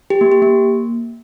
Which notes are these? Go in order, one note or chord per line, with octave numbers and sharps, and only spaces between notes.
G4
A#3
G4
A#3